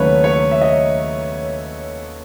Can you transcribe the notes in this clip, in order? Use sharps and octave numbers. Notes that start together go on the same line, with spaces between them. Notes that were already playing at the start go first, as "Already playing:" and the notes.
Already playing: D#2 C#3 F#3 A3 B4 C#5
C#5
E5
D#5